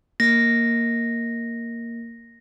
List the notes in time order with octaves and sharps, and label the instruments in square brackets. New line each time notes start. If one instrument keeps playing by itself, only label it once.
[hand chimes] A#3 [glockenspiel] A#6